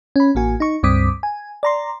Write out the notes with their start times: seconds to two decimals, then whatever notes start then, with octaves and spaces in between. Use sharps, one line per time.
0.16 C#4 B5
0.35 A1 A#3 F#4 G#5
0.60 D#4 C#6
0.83 C#2 G2 C4 D6 D#6 B6
1.23 G#5
1.63 D5 A#5 C6